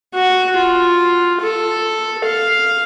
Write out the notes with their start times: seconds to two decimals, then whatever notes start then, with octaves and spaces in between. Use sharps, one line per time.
0.14 F#4
0.56 F4
1.41 A4
2.25 F5